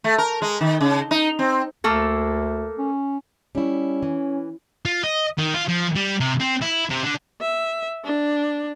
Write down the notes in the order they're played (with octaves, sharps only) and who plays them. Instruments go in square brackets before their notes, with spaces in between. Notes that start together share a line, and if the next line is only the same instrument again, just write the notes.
[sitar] A3
A#4
G#3
D#3
C#3
D#4
C4
[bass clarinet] D2 [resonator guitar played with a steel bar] A3 A#3 A4
[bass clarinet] C#4
[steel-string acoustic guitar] G3 E4 [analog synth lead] C#4
[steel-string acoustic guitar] E3
[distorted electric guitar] F4
D#5
D#3
F4
F3
G3
C3
C4
E4
C3
D3
[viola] E5
D4